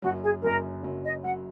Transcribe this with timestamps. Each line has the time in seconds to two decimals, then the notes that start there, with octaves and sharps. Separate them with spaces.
0.02 F#1 F#2 F#3 F#4
0.23 G#4
0.42 F#1 F#2 F#3 A#4
0.83 F#1 F#2 F#3
1.04 D#5
1.24 F#3 F#5